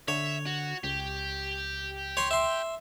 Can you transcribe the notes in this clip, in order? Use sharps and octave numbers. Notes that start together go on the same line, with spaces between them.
D3 C#5 E5
F#4
C#2 G4
C#5 C6
E5 C6